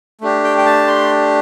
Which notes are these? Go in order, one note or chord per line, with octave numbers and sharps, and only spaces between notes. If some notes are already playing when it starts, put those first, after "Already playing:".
A3 D4 G4
G5
G5
A5
C6